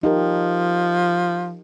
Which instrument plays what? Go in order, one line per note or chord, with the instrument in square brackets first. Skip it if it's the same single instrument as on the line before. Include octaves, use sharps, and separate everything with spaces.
[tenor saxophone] F3 [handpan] D#4 G4 A#4